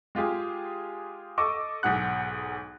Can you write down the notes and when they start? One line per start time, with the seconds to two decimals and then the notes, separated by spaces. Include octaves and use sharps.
0.15 G#3 F4 G4 G#4
1.38 A4 D#5 C#6 D6 E6
1.83 B1 G#2 G#4 F#5 F#6